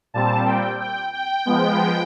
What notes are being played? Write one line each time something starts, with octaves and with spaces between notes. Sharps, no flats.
A#2 G3 C4 A5
G5
G5
G5
F3 G#3 B3